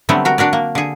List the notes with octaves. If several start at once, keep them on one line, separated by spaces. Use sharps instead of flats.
D3 F#3 G3 A3 B3 C4
F#4 A#4
D4 F#4 A#4 D5
A#3
D3 G#4